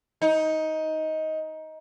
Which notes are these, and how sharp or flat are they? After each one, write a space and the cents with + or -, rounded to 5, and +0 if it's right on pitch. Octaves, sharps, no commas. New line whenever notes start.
D#4 +15